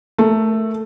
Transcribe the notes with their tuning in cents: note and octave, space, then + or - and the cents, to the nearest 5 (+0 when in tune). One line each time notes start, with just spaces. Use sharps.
A3 +0 A#4 -10